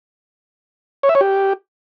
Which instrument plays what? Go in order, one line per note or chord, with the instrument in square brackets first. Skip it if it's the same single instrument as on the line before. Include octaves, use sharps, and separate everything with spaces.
[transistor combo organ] C#5
E5
C#5
G4